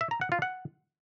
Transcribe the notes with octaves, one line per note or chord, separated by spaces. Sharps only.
E5
A#5
F#5
F4
F#5